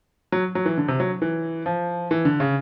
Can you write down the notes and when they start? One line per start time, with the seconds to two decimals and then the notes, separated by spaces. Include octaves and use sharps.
0.32 F#3
0.55 F#3
0.66 E3
0.77 D3
0.88 C3
1.00 F#3
1.22 E3
1.66 F3
2.11 E3
2.25 D3
2.40 C#3